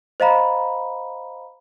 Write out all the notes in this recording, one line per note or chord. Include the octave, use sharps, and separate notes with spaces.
C5 D#5 F5 A#5 B5